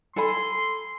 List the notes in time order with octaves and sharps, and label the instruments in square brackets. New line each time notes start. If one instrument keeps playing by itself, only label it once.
[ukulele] A4 G#5 B5 [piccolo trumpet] C6